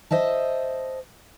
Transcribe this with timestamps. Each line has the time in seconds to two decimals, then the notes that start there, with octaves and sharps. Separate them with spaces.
0.11 C5 D#5 E5 A5